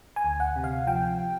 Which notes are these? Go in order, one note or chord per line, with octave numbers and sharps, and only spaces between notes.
G#5
D2
F#5
C3
F5
F3 G5